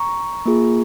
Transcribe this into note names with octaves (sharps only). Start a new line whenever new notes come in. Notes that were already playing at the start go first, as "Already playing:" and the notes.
Already playing: A#5 C#6
A#3 F4 G#4